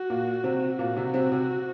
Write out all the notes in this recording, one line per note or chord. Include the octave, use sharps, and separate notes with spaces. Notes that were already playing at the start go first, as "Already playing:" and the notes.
Already playing: F#4
A#2 A#3
C3 C4
A#2 A#3 F#4
C3 C4
C3 C4
C3 C4